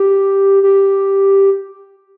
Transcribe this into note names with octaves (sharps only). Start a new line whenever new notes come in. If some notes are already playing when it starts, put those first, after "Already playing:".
Already playing: G4
G4